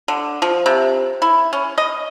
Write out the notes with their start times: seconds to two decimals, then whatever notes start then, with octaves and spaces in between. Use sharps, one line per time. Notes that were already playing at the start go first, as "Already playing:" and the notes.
0.08 D3
0.42 F3
0.66 C3
1.22 E4
1.53 C#4
1.78 D#5